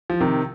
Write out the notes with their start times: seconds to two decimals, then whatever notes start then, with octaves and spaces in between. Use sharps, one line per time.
0.10 F3
0.20 C3 D#3